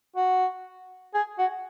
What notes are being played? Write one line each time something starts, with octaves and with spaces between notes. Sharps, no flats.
F#4
G#4
F#4